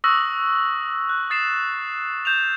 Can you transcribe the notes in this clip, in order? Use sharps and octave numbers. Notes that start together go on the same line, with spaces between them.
C#6 D#6 E6 F#6 A#6 F#7
F#6
D#6 A6 C7 E7
G6 E7 F7